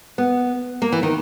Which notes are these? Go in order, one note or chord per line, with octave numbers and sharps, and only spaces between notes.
B3
A#3
E3
D#3